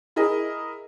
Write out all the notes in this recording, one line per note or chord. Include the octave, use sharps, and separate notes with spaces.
E4 G#4 A#4 D#5